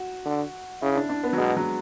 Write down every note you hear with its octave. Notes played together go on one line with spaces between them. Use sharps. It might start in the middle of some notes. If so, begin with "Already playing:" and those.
Already playing: F#4
D3
C#3 E4
D4
D4
B3
F#3
B2 G#3
F#3